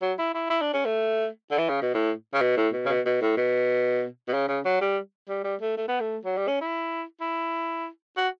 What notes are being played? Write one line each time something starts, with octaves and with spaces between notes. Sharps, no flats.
F#3
E4
E4
E4
D4
C#4
A3
D3
E3
C#3
B2
A2
C#3
B2
A2
B2
C#3
B2
B2
A2
B2
B2
C#3
C#3
F#3
G3
G3
G3
A3
A3
B3
A3
F#3
G3
C#4
E4
E4
F#4